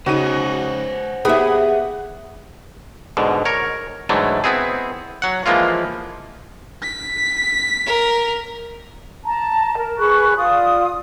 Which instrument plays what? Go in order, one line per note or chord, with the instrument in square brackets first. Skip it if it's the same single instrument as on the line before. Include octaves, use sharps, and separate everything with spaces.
[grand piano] C#3 D#4 D#7 [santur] F#4 [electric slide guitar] C5 C#5 G#5
[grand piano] B3 G4 B4 [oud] G#4 E5 [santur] F#5
[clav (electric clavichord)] G#2 B2 D3
A#4 C#5
G#2 D3 E3 F#3 A3
B3 C4 E4 G#4
F#3 F#5
E3 F3 G#3 A#3 F4
[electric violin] B6
[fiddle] A#4
[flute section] A5 A#5
A#4
G#4 B4 C#6 F#6
F4 D5 D#6